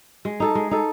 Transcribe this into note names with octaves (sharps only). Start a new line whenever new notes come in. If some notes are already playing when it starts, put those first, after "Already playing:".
G#3
D#4 A4
G#3
D#4 A4